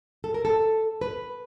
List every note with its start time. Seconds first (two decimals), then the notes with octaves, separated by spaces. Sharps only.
0.24 A4
0.34 A#4
0.45 A4
1.01 B4